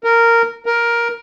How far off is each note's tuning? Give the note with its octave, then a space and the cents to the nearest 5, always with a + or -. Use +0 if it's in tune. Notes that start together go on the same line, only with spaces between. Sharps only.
A#4 -10
A#4 +10